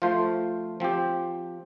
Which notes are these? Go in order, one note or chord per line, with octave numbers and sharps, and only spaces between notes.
F3 A3 F4 C5
F3 C4 G4